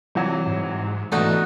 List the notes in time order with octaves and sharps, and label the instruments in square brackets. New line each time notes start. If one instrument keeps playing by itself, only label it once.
[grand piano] C3 E3 F#3 [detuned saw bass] G3
[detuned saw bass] G#2
[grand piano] B2 A3 [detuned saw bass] E3 [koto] D4 D#4 F#4